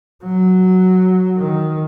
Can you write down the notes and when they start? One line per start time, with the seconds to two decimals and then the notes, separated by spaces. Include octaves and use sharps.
0.23 F#3
1.37 D#3